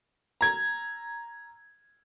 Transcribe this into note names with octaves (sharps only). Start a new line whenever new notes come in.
A#5 G#6